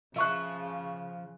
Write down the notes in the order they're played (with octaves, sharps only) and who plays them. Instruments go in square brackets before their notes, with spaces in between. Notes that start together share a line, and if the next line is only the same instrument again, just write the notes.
[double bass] C#3 [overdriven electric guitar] F3 [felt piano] E5 C#6 F#6